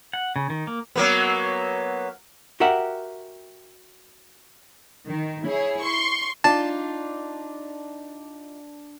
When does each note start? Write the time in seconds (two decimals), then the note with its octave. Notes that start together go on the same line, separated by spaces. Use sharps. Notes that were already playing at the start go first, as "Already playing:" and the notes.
0.13 F#5
0.36 C#3
0.50 D#3
0.67 A#3
0.96 F#3 A#3 B3
2.60 F#4 G4 A#4 E5 F#5
5.05 D#3
5.46 E4 G#4 C#5
5.81 C6 C#6
6.44 D4 D#4 F4 A5